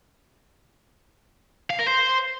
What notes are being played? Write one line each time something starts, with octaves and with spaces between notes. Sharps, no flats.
F5
A#4
C5